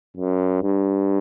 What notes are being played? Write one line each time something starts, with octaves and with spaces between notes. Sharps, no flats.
F#2
G2